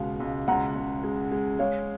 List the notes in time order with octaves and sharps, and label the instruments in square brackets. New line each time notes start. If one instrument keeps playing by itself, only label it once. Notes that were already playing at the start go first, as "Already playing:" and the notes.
Already playing: [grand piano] C#2 B2 G#3 [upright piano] F5
[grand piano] C#2
[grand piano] C#2 [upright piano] F#5 A#5
[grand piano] C#2
G#3
G#3
[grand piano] G#3 [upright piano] C#5 F5